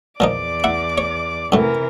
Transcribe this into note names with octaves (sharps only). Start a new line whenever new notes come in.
E2 A#2 F3 D#4 D5 D6
E4 F#5
C#5
F#2 A2 C3 E3 A#4